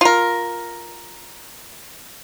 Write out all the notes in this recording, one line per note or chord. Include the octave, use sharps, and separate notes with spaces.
F4 A#4